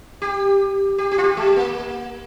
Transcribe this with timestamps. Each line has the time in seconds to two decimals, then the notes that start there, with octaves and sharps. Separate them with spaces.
0.22 G4
0.98 G4
1.12 G4
1.18 F4
1.23 G4
1.37 G#3
1.56 A#3